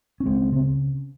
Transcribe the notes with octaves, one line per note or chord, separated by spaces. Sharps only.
C#4
C#2 G#3 C4
C#3 C4